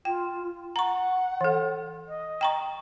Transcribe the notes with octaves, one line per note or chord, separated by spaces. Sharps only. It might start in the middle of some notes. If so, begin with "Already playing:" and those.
F4 G5
F#5 A#5 C#6
E3 A4
D#5
G5 A#5 C#6